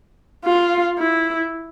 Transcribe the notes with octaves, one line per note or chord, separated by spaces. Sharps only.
F4
E4